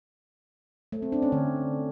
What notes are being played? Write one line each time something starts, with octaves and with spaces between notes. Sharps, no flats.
A3
C4
D4
C#4
D3